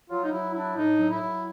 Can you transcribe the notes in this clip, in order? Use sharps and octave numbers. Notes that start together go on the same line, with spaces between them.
F#3 F4
D#4
F#3 E4
D4 E4
A2 D#4
F#3
E4
F#3